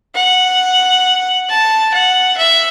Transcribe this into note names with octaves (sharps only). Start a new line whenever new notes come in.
F#5
A5
F#5
E5